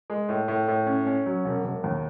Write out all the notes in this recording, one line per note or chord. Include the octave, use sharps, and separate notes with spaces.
G#3
A2
A2
A2
C#4
C#4
F#3
E1
E1
D#2